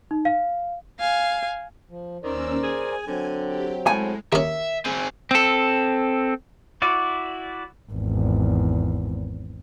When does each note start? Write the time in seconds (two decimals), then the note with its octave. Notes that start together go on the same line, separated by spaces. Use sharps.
0.11 D#4
0.25 F5
1.00 F5 G#5
1.90 F3
2.23 D#2 D#3 C#4 A#4 C5 D5 E6
2.63 G#4 G#5
3.07 D3 F#3 C4
3.46 G4
3.87 A2 G#3 G#5
4.33 D#2 C#4 E5
4.86 C4 G#4
5.31 C4 A4
6.82 E4 F#4 D5
7.92 G#1 E2